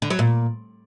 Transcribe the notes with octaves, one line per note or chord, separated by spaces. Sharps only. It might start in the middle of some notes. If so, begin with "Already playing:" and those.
D3
F#3
A#2